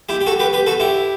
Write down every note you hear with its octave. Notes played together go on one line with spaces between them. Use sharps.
E4 G4
G4
F#4 A4
G4 B4
G4 B4
F#4 A4
E4 G4